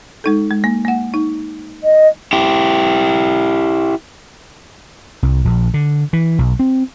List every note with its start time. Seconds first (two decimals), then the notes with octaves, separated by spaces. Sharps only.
0.24 G#3 D#4 A4
0.50 G#3
0.64 A#3
0.85 A#3 F#5
1.14 D#4
1.84 D#5
2.33 E4 G4
5.23 C2
5.45 A#1
5.74 D3
6.13 E3
6.38 B1
6.59 C4